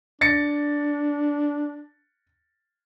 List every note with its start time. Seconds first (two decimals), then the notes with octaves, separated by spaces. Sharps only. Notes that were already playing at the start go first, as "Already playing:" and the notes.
0.21 D4 A6 A#6 C#7